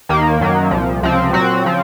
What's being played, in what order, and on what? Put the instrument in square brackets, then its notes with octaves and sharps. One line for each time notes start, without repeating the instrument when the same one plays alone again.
[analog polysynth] D#2 D#3 A#3
F#2 D#3 F#3 A#3
C2 A#2 F3
C#2 C3 F3 C4
A#2 F#3 C4 F#4
C#3 F3 C4